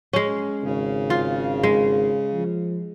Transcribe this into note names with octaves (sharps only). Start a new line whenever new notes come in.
G#3 C#4
G#1 C#3
F4
G#3
F3